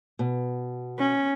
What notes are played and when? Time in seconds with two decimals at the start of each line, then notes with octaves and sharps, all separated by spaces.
0.19 B2
0.99 C#4